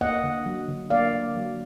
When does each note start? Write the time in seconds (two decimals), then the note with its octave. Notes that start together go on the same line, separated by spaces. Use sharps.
0.01 A#3 D#5 F#5
0.23 D3
0.46 F#3
0.68 D3
0.90 A#3 D5 F5
1.13 D3
1.36 F#3